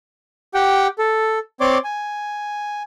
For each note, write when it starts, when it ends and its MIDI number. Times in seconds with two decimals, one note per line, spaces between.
0.54 0.87 67
0.54 0.87 78
0.54 0.87 79
0.99 1.39 69
1.61 1.78 60
1.61 1.78 73
1.61 1.78 74
1.61 1.78 84
1.61 1.78 86
1.84 2.83 80